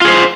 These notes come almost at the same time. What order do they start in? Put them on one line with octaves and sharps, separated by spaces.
F4 G#4 C5